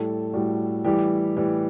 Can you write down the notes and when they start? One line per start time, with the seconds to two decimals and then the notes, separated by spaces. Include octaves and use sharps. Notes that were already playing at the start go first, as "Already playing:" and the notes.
Already playing: A2 G3 A4
0.33 A2 G3 F#4
0.85 A2 E3 G3 G4
1.36 A2 E3 G3